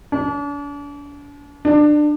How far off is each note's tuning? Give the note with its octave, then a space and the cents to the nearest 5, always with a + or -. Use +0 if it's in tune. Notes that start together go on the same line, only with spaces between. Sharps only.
D4 -40
D4 +25